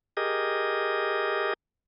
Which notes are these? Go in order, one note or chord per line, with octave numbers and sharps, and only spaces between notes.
G4 G#4 A#4 D#5